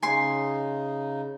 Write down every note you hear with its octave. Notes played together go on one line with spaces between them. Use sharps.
C#3 D#4 G#5 C6